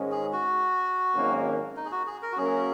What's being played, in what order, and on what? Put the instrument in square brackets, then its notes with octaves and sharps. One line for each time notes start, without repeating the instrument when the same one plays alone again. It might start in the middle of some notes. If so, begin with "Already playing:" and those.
Already playing: [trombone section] G#2 D#3 G#3 C#4
[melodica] G#4
F#4
[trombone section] G#1 F#2 D#3 A#3 C#4
[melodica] D#4
G#4
F#4
G#4
A#4
F#4
[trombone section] F#2 F#3 A#3 C#4 A#4 [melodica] G#4